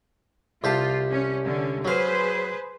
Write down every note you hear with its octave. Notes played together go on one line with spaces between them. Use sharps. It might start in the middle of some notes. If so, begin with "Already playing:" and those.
C2 F4 G4 A5
C#4
D3 C#4
F#3 G#4 B4 C5 F5